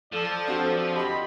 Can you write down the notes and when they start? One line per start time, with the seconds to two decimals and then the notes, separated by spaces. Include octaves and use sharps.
0.13 F3 A4 D5
0.48 C4 D4 F#4
0.96 G4 D#5 B5 C6